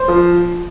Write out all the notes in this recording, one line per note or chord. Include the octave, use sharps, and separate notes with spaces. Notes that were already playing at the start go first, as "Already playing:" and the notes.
Already playing: C5
F3